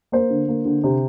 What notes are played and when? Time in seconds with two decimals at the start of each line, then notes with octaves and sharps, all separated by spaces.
0.12 A#3 C5
0.30 D3
0.48 A#3
0.65 D3
0.84 C3